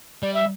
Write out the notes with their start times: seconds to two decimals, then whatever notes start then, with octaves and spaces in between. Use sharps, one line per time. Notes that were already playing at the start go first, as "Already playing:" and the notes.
0.22 G3 D5
0.34 E5